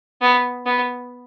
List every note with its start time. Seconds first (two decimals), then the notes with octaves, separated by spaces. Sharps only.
0.22 B3
0.66 B3